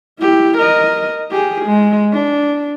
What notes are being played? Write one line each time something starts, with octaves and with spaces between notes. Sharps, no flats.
E4 G4
A#4 D#5
G4 G#4
G#3
D4